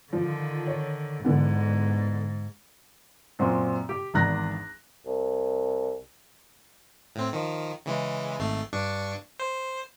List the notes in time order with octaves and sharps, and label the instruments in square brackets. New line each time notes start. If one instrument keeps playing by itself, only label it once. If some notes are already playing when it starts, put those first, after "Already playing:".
[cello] D3 D#3 [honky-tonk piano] F3
[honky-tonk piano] C#5
[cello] G#2 [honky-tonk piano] D3 E3 B3
[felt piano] F#2 A#2 C4 F#4
G4
G#1 E2 D4 A#5 F#6 A#6
[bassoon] C2
[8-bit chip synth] A2 C4
D#3 F3
C#3 E3 G#3
G#1 A3 C7
G2 D4 C#6
C5